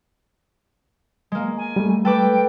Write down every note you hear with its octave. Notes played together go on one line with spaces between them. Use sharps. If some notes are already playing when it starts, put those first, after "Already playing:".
G#3 A#3
G#5
G3 A3
A4 B4 G5 D6